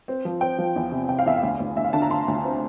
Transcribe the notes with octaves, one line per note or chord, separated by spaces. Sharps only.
C4
F3
C4 G5
F3
E2
C3
C3 G5
F5
E2 E5
F5
D2
D2
D2 E5
F5
D3 A5
A#5
D3 C6
D2
C4